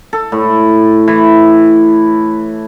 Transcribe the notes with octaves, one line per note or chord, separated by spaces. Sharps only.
A4
A2
E3